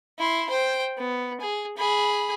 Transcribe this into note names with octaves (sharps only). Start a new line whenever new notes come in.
E4 C6
C5 G5
B3
G#4
G#4 B5